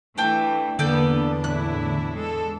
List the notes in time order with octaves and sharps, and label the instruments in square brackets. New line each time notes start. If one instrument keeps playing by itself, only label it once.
[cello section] E3 A3 [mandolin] D4 G5
[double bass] E2 D4 [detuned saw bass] D3 [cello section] A#3 B3 [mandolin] A4 D5 G6
[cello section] A2 E4 [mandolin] F#6
[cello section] G#3 A4